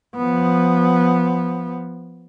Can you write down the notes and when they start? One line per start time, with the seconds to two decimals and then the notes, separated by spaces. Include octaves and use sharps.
0.16 F3 B3